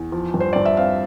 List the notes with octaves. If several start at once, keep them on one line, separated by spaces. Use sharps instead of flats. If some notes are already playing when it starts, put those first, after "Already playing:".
Already playing: E2
F3
G2
C5
G2 D5
E5
C4 F5